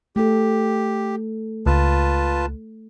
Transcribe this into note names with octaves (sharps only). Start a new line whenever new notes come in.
A3 G4 A4
C#2 F4 B4 A5